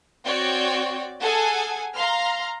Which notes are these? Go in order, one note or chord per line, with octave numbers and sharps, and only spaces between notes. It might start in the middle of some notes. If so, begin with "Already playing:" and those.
C4 F#4 C#5 D5 G5
G#4 A4 F#5 G#5
F5 A#5 C6 F6